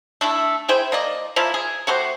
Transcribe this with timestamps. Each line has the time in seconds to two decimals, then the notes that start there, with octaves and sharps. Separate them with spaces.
0.21 A3 D4 E4 A4
0.68 E4 G#4 C5 G5
0.92 A#3 D5 D#5
1.36 F3 A#3 E4 F4
1.54 G#4
1.87 A3 F#4 G4 C5